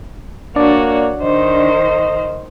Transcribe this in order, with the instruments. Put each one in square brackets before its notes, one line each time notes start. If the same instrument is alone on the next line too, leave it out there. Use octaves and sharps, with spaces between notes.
[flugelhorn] A#3 [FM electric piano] D4 D5 [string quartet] F#4 C#5
[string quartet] D#3 C5 [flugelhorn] D#5